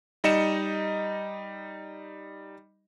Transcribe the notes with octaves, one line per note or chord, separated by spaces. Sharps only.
G3 D#4 D#5 C#7 E7